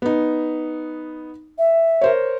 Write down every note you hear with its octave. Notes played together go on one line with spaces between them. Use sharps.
B3 D#4
E5
A#4 C5 C#5